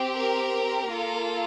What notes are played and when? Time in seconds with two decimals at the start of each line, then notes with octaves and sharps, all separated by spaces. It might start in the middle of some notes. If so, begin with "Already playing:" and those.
Already playing: C4 G4
0.16 A#4
0.88 A#3 F4 A4